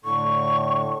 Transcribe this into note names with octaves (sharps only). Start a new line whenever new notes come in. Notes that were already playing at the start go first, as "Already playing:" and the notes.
A2 D3 C#6